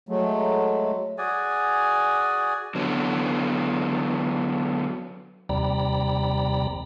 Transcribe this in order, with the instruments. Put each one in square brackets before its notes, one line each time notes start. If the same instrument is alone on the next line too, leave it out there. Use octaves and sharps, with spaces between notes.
[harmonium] F#3 G#3 A3
[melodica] F#4 G#4 D5 G#5
[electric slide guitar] D3 F#3 B3
[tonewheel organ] D#2 C3 G3 D5 A#5 B5